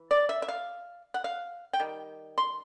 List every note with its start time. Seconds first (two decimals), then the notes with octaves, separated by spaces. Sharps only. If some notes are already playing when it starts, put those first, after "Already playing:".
Already playing: E3
0.11 D5
0.29 E5
0.42 E5
0.48 F5
1.14 F#5
1.24 F5
1.73 G5
1.80 D#3 G3
2.38 C6